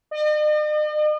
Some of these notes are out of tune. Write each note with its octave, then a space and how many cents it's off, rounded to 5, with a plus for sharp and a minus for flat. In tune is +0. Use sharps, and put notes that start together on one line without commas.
D#5 -45